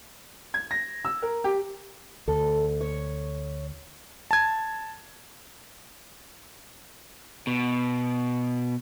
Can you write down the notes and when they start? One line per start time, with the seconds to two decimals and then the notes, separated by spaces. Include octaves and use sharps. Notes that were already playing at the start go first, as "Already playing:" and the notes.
0.54 G#6
0.71 A#6
1.05 E6
1.22 A#4
1.44 G4
2.28 D2 A4
2.81 C#5
4.31 A5 G#6
7.47 B2